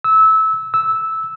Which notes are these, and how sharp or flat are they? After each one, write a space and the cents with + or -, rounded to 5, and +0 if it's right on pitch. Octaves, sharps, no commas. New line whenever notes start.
E6 -20
E6 -10